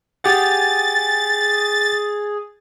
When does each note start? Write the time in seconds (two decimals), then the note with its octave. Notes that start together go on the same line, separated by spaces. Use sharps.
0.24 G4 G#4 F#5 A6